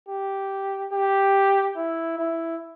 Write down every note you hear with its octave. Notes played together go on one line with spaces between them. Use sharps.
G4
G4
E4
E4